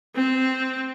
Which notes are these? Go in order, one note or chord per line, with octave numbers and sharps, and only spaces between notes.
C4